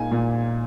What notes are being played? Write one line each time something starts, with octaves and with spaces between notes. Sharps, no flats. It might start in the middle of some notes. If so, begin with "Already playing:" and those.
Already playing: A#2 A#3 D#4 G#5
A#2